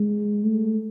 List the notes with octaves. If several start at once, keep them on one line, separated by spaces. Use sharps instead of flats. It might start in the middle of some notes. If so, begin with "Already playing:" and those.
Already playing: G#3
A3